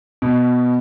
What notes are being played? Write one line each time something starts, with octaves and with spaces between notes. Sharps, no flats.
B2